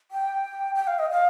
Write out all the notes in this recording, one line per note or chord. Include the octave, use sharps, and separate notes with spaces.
G5
G5
F5
D#5
F5